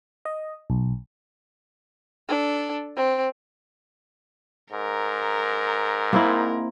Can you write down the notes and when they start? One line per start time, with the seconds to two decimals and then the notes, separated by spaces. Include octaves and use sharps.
0.25 D#5
0.70 B1
2.29 D4 A4
2.96 C4
4.72 G#2 A#4
6.13 A#3 C4 E4